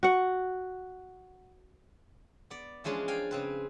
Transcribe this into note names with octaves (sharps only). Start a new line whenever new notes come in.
F#4 F#5
B3 D5
E3 F3 G#3 C#4 D4
D5 F5 G5 G#5
C#3 C4 B4